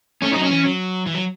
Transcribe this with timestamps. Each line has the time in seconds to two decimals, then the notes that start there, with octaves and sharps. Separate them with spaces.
0.22 A3 C#4
0.33 F#3 D#4
0.43 C#4
0.50 E3
0.64 F#3
1.06 E3
1.15 F#3